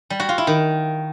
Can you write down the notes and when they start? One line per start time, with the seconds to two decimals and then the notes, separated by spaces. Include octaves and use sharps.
0.10 G3
0.20 F#4
0.29 F4
0.38 E4
0.47 D#3